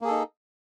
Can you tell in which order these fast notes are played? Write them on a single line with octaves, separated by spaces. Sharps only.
A#3 G#4 A4 D#4